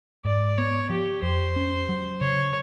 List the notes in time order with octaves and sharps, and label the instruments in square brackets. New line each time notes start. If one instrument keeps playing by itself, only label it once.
[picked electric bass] G#2 [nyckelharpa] D5
[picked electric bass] B3 [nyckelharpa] C#5
[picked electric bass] F3 [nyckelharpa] G4
[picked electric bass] F2 [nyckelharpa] C5
[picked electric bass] C#4
F#3
[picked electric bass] C#3 [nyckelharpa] C#5